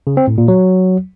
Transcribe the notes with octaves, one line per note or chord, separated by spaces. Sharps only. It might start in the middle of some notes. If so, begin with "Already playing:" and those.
C#3
C4
A2
A#2
F#3